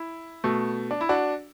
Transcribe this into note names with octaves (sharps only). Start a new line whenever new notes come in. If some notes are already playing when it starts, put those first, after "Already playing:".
Already playing: E4
B2 A3
D4
E4
D4 F#4